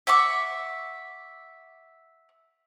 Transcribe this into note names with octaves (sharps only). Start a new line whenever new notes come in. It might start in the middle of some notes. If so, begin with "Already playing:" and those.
E5 F#5 C#6 D6